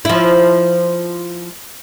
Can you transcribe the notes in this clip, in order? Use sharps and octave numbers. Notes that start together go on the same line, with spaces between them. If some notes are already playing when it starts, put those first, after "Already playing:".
F3 E4